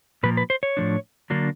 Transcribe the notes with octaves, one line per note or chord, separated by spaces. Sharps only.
A#2 F3 A#3 B4
B4
C5
C#5
A2 F3 A3 D4
D3 F#3 A#3 D4